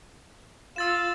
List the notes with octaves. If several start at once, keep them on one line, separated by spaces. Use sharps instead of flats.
F4 E6 A6 E7